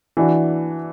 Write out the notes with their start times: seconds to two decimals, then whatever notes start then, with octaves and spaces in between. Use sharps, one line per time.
0.17 E3 D4 F#4